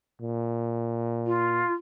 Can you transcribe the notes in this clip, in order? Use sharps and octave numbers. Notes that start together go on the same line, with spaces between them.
A#2
F4